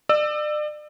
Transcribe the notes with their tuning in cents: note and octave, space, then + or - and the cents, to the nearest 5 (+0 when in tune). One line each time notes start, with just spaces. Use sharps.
D5 +40 E6 +5